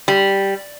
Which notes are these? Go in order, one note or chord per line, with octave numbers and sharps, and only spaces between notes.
G3